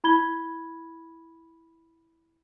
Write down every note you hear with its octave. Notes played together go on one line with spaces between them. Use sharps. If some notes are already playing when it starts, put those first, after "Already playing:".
E4 B5 G#6 G7